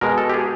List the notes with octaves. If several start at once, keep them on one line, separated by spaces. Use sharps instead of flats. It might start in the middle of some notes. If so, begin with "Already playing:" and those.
B2 G#3 A#4
A4
G4
G#4